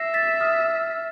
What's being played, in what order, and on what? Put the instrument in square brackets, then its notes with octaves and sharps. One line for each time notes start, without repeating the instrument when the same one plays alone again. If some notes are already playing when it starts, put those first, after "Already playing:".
Already playing: [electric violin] E5 [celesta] A#6 C7
[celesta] A6 B6
D#6 F6